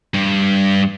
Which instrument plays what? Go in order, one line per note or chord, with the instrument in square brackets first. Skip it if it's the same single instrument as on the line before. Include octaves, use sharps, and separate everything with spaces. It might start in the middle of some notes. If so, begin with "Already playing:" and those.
[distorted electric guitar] G2